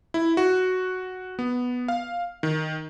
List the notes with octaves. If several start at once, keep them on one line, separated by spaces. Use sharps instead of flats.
E4
F#4
B3
F5
D#3